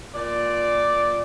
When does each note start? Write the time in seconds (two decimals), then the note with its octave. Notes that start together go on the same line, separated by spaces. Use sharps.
0.14 A#2 D5